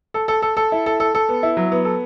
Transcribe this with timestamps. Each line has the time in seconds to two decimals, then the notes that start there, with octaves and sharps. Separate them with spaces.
0.14 A4
0.28 A4
0.42 A4
0.57 A4
0.72 E4
0.86 A4
1.00 A4
1.15 A4
1.29 B3
1.43 E4
1.57 F#3
1.72 B3
1.85 A4